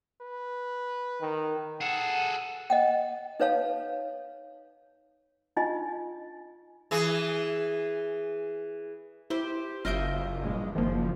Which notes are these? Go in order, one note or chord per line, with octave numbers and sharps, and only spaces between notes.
B4
D#3
G#4 A4 F#5
D#5 F#5 G5
D#4 B4 C#5 F5 A5
D4 D#4 F4 D#5 G#5
E3 G#4
E4 G4 C5
F#1 F#2 F4 D#5 E5 G6 D7
A#1 G2 G#3
F#1 D#3 F3 A#3